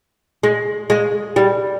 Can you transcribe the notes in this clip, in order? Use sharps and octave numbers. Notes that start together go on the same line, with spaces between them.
G#3
G#3
G3